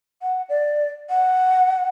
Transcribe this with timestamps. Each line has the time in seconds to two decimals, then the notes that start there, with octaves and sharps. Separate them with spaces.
0.22 F#5
0.49 D5
1.10 F#5